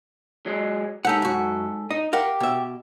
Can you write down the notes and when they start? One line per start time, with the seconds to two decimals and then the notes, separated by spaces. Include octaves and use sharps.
0.46 F#3 G#3
1.05 G#2 D#4 G4 A4 F#5
1.22 F#2 F#4
1.91 D#4 D#5
2.13 G4 A#4 F5 F#5
2.40 B2 E5